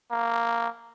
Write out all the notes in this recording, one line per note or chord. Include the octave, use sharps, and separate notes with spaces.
A#3